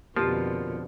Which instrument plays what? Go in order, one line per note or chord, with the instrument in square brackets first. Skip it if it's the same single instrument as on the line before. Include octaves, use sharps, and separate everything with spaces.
[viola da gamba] F2 B2 D3 [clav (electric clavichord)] F3 [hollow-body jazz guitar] A#3 F4 [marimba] G4